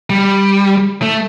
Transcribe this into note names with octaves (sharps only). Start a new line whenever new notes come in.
G3
A3